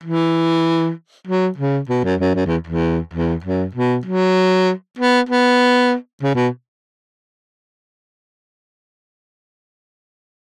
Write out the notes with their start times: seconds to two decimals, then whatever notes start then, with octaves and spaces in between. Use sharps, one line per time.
0.03 E3
1.27 F#3
1.57 C#3
1.89 B2
2.04 F#2
2.20 F#2
2.35 F#2
2.46 E2
2.67 E2
3.13 E2
3.44 F#2
3.75 B2
4.05 F#3
4.99 B3
5.29 B3
6.22 C#3
6.35 B2